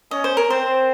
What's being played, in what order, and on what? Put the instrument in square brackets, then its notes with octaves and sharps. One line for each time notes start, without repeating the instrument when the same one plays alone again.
[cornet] C#4 [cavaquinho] D#5
[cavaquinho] C5
A#4
[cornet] C4 [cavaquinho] C5